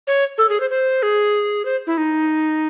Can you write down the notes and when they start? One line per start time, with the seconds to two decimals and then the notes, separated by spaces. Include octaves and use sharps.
0.07 C#5
0.38 A4
0.49 G#4
0.60 C5
0.70 C5
1.03 G#4
1.65 C5
1.87 E4
1.98 D#4